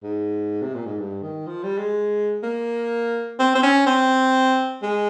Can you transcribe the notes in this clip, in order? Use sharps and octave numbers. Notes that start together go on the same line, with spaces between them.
G#2
C3
A#2
G#2
G2
D#3
F3
G3
G#3
A#3
C4
C4
C#4
C4
G#3